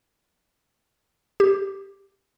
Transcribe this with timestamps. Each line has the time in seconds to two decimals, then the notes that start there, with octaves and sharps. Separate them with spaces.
1.40 G4